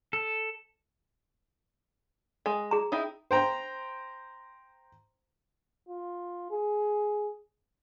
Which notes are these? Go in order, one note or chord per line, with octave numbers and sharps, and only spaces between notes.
A4
G#3
G#4 A#5
D#4 E4 G5
C5 G5 A#5
F4
G#4